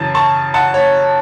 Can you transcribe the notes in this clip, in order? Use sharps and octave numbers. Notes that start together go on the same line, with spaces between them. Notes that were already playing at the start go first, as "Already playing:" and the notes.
Already playing: F#2 C#3 E3 A5
A5 C#6
F#5 A5
C#5